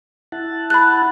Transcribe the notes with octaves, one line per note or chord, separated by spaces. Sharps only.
E4 F#5 A5
B5 F#6